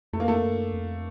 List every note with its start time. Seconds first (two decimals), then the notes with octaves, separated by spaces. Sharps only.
0.13 F2 A3
0.20 A#3
0.28 A3
0.43 F#2
0.73 F2